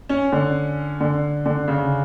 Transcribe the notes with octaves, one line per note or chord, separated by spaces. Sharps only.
C#4
D3
D3
D3
C#3